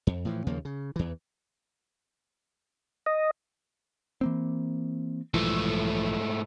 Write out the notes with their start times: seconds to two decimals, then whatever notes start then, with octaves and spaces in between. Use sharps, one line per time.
0.07 F2
0.25 A2 E3 F3
0.47 D#2 C#3 F3 A#3
0.65 C#3
0.96 E2 E3
3.06 D#5
4.21 E3 A#3 C4
5.34 B1 G#2 E3 F3 A3